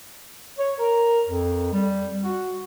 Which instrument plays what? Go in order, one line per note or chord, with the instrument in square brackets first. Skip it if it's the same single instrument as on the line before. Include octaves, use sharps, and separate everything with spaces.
[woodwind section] C#5
A#4
F2
G3
F#4